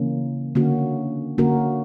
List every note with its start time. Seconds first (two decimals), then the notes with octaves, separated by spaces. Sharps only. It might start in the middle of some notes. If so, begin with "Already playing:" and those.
Already playing: C#3 E3 A#3 C#4
0.55 D3 A#3 C#4 F#4
1.38 D3 A#3 C#4 F#4 A#4